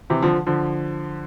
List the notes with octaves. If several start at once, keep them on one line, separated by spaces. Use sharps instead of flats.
C3 E3
D3 F3
D3 F3